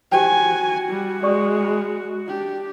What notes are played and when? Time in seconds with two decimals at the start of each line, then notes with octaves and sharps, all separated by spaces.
0.12 F#4 G4 C5 G5 G#5
0.88 G3
1.23 G#3 D5 C#6 D#6
1.64 B5
2.27 D4 G4